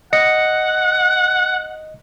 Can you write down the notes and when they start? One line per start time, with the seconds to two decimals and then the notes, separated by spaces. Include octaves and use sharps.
0.13 D#5 F#5 A#6 C#7